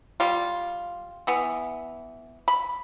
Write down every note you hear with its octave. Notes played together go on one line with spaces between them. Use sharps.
G3 F4
E3 B3
B5